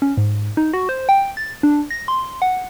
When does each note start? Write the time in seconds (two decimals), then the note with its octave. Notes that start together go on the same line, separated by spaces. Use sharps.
0.02 C#4
0.17 G#2
0.57 D#4
0.73 F#4
0.89 C5
1.09 G5
1.37 A6
1.63 D4
1.91 A#6
2.08 C6
2.42 F#5